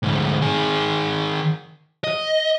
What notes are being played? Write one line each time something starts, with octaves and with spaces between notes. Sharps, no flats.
D2 G#2
D#3 G#4
D#5